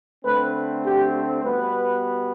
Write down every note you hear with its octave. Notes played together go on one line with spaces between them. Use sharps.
D3 A3 C4 B4
G4
B2 G3 B3 B4